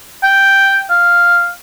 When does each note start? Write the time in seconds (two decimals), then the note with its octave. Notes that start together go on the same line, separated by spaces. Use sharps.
0.23 G5
0.90 F5